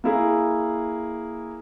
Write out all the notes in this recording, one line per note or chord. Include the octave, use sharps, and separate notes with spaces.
A#3 E4 G#4